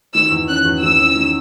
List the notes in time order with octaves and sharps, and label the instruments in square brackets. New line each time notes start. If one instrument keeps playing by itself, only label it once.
[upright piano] D#3 [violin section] E6
[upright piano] E2
[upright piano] C#4 [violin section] F#6
[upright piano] E2
[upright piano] E2 [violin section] E6
[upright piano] C#4
D#3